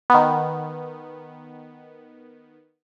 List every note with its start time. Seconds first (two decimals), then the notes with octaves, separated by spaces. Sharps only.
0.10 D#3 B3